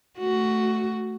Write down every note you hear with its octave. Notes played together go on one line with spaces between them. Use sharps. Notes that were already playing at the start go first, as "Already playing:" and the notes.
A3 F#4